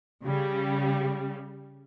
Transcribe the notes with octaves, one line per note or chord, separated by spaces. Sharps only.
C#3 G3